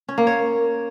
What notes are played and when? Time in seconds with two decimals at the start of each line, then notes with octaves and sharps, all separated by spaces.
0.08 C#4
0.18 A#3
0.27 C#5